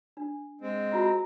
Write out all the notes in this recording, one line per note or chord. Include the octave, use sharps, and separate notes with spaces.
D4
G#3 C4
F4 F#4 F#5 A#5